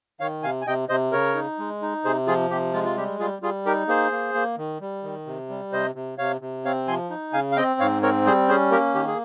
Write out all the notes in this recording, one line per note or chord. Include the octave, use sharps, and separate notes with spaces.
D#3 C#5 F5
C3 F5 G#5
G#5
C3 D#5 G5
C3 C5 D#5
C#3 A#4 C#5
D#4
G#3
D#4
C3 G#4 C5
F3 F4 G#4
C3 G4
G#3 F4
F4
G3 G4
G3 F4 G#4
G3 F4 G#4
D#4 G4 A#4
A#3 G#4 C5
A#3
A#3
D#3
G3
D#3
C3
G3
C3 C5 D#5
C3
C3 C#5 F5
C3
C4 C#5 F5
F3 G#5 C6
D#4
C#3 F5 G#5
F5
C4 D#5 G5
G#2 C#5 F5
C4 A#4 C#5
G3 G#4 C5
C#4 G#4 C5
A#3 G4 A#4
D#3 G4
G#4